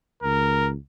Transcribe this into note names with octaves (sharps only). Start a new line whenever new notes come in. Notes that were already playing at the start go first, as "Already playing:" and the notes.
C#2 A#4